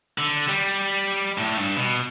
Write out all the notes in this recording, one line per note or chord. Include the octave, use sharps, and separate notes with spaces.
D3
G3
A2
G2
B2